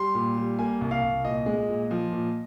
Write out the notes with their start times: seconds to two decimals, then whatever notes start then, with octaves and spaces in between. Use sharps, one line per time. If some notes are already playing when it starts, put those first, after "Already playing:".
Already playing: G3 C6
0.15 A#2
0.37 G3
0.59 A#3 G#5
0.81 C2
0.91 F5
1.03 C2
1.25 A#2 D#5
1.46 G#3
1.69 A#2
1.91 F3
2.12 A#2